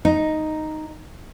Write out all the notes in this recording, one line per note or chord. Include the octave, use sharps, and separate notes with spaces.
D#4